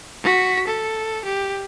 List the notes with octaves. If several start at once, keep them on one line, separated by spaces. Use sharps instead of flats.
F#4 B6
A4
G4